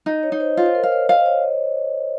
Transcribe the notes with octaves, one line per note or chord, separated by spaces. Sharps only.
D#4 D#5
C#5
D#4
C5
F4
C5
A#4
F5
C#5
D#5 F5
C5
C#5